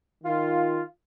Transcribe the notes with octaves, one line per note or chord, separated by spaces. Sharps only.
D#3 F4